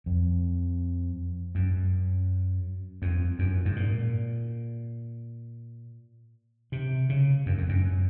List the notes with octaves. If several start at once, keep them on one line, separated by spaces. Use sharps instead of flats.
F2
F#2
F2
F#2
G#2
A#2
C3
C#3
F#2
F2
F#2